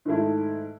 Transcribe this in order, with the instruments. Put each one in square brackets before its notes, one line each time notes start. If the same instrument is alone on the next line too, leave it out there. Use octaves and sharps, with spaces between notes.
[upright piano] G#2 D#3 A3 E4